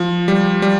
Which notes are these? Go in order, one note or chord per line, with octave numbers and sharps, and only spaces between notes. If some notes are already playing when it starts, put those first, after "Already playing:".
Already playing: F3
G3
G3